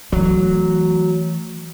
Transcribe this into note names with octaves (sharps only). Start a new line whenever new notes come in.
E3 F#3 A3